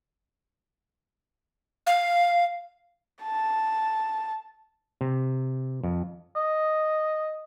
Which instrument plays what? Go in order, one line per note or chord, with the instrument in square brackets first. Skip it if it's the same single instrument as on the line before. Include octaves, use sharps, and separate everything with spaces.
[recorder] F5
[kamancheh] A5
[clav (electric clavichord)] C3
F2
[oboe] D#5